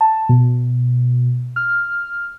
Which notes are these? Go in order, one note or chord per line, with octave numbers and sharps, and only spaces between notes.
A5
B2
F6